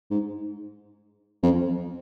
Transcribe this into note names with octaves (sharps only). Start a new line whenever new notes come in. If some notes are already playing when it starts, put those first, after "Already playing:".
G#2
F2